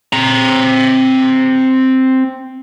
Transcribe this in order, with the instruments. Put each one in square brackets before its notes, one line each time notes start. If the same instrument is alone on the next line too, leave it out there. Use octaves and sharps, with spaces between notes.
[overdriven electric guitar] C4 A#5